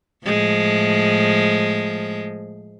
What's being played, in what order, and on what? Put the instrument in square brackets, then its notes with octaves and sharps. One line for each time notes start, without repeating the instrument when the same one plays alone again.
[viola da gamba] A2 F3 G#3